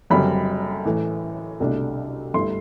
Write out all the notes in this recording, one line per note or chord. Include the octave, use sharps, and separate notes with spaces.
F#1 F#2 D3 G3 C4 B5
A2 E3 A3
C2 B2 A3 D4
G1 G2 D3 A3 E4 C6